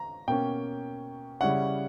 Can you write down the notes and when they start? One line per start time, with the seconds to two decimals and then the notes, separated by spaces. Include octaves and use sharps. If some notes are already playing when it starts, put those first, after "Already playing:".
Already playing: A#5
0.28 B2 A#3 C#4 G5
1.41 C#3 G3 C#4 E4 F#5